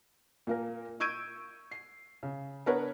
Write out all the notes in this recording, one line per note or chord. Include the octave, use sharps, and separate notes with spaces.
A#2 A#3 A#4
C#6 E6 G6 G#6 D7 D#7
C7
C#3
B3 D4 A#4 B4 C#5